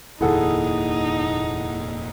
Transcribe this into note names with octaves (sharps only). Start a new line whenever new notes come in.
F1 D#2 A#2 D#4 E4 G#4 A4 F#5